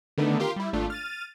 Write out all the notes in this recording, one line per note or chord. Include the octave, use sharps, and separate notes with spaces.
D3 D#3 A3 B3 D4 D#4
F4 G4 A#4 C6
G3 E4
G#1 A3 D4 F4
F6 A6 D#7